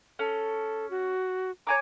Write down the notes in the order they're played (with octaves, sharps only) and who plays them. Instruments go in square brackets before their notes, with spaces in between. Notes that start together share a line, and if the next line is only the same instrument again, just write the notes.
[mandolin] C#4 [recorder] A4
[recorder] F#4
[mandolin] C#5 G#5 D6 [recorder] A#5